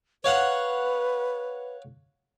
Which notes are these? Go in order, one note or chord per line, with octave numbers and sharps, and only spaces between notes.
B4 C#5 F5 F#5